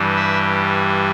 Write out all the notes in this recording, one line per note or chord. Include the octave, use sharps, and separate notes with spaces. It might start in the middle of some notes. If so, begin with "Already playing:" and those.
Already playing: G2 E3 G3
E5